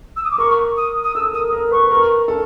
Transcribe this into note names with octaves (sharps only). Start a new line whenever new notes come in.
E6
D#6
D6
A#4 C#6
D#6
D#6
A4 E6
A#4 D#6
A#4
B4 C#6
A#4
A4